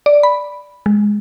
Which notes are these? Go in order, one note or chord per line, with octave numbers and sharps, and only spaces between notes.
D5
B5
G#3